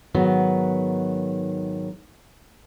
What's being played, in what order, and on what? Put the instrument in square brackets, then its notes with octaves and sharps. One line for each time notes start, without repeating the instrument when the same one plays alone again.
[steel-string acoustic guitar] G#2 D#3 F#3 B3